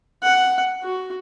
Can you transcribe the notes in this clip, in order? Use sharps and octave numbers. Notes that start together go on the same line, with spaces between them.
F#5
F#4